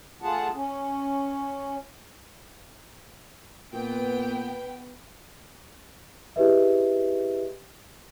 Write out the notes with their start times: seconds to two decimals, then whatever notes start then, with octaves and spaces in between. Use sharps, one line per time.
0.22 A3 F4 G#4 F#5 A5
0.54 C#4
3.73 A#2 B3 G5
6.36 E4 G4 G#4 B4 D#5 E5